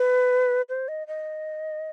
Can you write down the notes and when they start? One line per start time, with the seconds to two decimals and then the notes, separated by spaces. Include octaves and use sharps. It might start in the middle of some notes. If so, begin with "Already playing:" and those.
Already playing: B4
0.69 C5
0.88 D#5
1.07 D#5